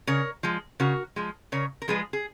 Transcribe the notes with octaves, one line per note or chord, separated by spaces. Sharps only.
C#3 A#4 C#5
F3 G#3
C#3 F#4 A#4
F3 G#3
C#3 A#4 C#5
A#4
F3 G#3 G#4 B4
G#4